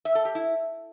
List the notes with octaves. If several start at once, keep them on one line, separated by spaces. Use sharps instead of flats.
E5
A4
G4
E4